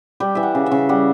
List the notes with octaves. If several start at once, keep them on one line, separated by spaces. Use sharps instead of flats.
G3 G5
E3 E5
F#5
C#3
E5
C#3
G3 F#5